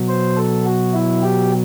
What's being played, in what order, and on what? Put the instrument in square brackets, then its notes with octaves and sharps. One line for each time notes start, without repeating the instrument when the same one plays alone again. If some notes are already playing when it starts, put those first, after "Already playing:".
Already playing: [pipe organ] B2 F#3
C5
A4
F#4
E4
G4